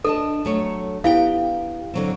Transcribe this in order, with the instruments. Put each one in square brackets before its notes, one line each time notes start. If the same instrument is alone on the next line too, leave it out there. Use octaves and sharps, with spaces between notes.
[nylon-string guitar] D4 D#5 A5 [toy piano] A4
[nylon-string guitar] F#3 A3 C#5
[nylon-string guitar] B3 G4 G5 [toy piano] E4 F5
[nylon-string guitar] D3 F#3 C4